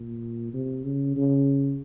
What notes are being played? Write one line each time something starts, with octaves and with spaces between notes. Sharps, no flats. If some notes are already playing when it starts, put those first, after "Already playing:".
Already playing: A#2
C3
C#3
C#3